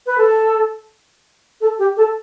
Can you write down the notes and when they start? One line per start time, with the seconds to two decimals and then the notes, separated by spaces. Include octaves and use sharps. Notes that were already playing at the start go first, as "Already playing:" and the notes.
0.06 B4
0.18 A4
1.61 A4
1.79 G4
1.97 A4